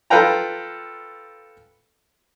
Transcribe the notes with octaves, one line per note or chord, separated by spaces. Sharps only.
F4 A4 B4 F5 G5 A#5